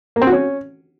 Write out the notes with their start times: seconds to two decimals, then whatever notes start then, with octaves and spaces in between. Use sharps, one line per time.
0.16 A#3
0.22 C4
0.27 F#4
0.33 C#4